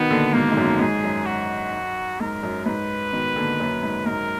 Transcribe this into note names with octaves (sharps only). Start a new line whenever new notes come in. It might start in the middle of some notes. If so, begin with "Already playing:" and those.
Already playing: B2 D#3 B3
A#2 D3
G#2 B2 A#3
G#2
F#2 A#2
G#2 G#4
F#2
F#4
G#2 A#4
F#2
G#2 B4
B2 D#3
A#2 D3
F#2 A#2
G#2
G#2 A#4